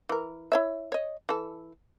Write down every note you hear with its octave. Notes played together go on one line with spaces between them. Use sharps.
E3 A#4
E4 C#5 E5
C#5 D#5
E3 A4